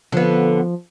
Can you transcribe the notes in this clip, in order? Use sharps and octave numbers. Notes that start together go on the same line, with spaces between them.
D3 F3 B3